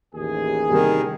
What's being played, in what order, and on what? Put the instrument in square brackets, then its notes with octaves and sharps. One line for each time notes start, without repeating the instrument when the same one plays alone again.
[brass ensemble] A1 D#2 G#4
[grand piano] C3 G3 A#3 [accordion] D#3